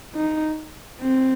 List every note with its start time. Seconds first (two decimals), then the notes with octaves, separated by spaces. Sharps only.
0.16 D#4
1.01 C4